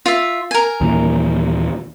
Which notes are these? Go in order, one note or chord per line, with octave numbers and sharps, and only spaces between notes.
F4 E5
A#4 G#5
D#2 A#2 E3